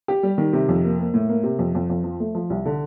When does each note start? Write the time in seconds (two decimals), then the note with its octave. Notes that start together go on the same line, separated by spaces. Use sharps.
0.08 G4
0.23 G3
0.38 D#3
0.53 C3
0.69 F2
0.84 A#3
0.99 A#3
1.14 A2
1.29 A#3
1.43 C3
1.59 F2
1.75 F2
1.90 F2
2.04 F3
2.20 A3
2.35 F3
2.50 C2
2.66 D3